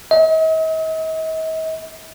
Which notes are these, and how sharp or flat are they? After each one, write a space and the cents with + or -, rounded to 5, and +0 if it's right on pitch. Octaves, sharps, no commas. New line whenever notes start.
D#5 +45